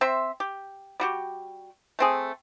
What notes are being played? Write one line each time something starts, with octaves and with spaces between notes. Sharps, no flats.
C4 C5 E5
G4
G3 F#4 G4
A3 C4 G#4